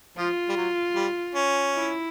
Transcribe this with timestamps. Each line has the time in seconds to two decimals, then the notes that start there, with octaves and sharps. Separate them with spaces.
0.17 F3 F4
0.49 G3
0.57 F#3
0.95 G3
1.35 C#4
1.74 E4